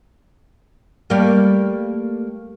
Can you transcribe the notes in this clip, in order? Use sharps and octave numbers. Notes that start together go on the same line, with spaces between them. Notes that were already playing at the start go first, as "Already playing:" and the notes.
G3 A3 A#3